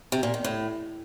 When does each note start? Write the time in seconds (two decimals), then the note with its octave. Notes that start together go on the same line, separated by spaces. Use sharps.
0.12 C3
0.23 A#2
0.34 D#3
0.44 A2